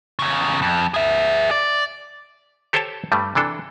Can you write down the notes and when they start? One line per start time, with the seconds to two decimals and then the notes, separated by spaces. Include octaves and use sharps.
0.19 E2 C#3
0.62 F2
0.94 G#4 E5
1.51 D5
2.73 G4 A4 C5 C#5 G5 A5
3.12 G2 G3 A3
3.35 C3 E3 D4 A4